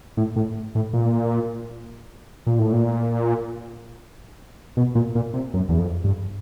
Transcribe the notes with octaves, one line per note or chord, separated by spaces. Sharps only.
A2
A2
A2
A#2
A#2
A2
A#2
B2
A#2
A#2
C3
F#2
E2
F2
G2